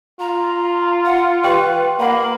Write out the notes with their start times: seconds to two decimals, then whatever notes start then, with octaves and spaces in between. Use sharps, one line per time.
0.20 F4 A#5
1.05 F#5
1.44 G4 B4 G5 C6
2.00 A#3 F5 F#5 B5